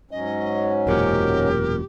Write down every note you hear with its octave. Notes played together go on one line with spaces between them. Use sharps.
G#2 F#3 C#4 D#5
E1 F#2 A#2 G4 A#4